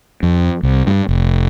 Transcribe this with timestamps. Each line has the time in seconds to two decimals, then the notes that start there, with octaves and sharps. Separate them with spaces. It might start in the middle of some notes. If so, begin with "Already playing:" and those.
0.23 F2
0.63 C2
0.87 G2
1.09 F1